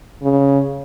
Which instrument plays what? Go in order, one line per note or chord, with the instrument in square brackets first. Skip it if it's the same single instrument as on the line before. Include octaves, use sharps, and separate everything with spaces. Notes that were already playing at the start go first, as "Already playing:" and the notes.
[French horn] C#3